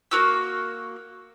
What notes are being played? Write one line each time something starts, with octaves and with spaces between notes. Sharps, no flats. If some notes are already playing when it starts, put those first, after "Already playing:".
A#3 F#4 E6